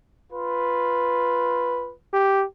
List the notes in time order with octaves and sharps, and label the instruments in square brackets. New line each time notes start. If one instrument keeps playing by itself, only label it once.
[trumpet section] F4 B4
[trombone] G4